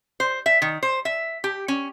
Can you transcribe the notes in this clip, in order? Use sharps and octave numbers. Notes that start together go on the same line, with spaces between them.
C5
E5
D#3
C5
E5
G4
C#4